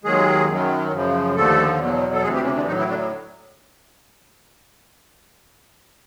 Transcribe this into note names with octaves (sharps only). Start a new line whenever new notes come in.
D#2 D#3 F#3 G#3 G#4
F#2 D#3 F#3
F#2 C#3 F3
D#2 D3 F3 A3 A4
E2 B2 F#3
A4
D2 C3 E3 G#3 G#4
G3 G4
C#3 C#4
D3 D4
A2 D#3 F#3 D#4
E3 E4
D3 D4